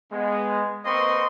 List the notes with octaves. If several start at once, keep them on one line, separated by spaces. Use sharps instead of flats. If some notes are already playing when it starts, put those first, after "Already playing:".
G#3 B3
A#3 C4 B4 D#5 C6 C#6